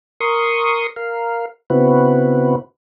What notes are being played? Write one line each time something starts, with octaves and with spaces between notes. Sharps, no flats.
A#4 C6 C#6 D#6
A#4 F5
C#3 B3 C4 E4 F#4 B4